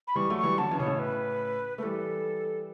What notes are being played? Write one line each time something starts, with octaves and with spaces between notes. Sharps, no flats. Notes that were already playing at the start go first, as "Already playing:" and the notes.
B5
E3 G3 C#6
F#3 A3
C#6
E3 G3
D3 F#3 A5
C#3 E3
B2 C#5
A2 C#3
B4
A3 B4
E3 G3 A4